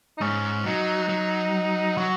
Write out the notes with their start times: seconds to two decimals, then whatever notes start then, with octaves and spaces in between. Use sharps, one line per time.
0.18 D#4
0.21 G#2 C#4
0.65 F#3 D#4
1.09 F#3
1.97 F#3 F#4